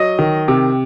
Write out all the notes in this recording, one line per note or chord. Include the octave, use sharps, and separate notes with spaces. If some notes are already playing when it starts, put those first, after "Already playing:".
Already playing: F#3 D#5
D#3
C3